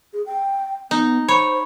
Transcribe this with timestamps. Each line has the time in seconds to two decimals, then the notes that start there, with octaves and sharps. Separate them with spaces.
0.13 G#4
0.26 G5
0.91 B3 D#4
1.29 C5 C#5 B5